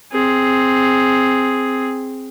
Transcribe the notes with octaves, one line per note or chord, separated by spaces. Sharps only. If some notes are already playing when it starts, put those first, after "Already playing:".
C4 G#4